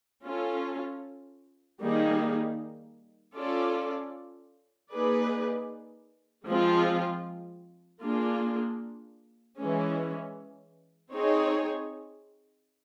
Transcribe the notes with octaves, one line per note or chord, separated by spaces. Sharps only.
C#4 F4 A4
D#3 G3 A#3 D#4 G#4
C#4 F4 A4 D5
A#3 D#4 G#4 B4 D5
F3 G#3 C4 F4
A#3 D4 F4 G#4
E3 G#3 C#4
C4 D#4 G#4 C#5